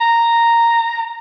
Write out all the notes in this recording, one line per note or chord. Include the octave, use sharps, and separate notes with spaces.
A#5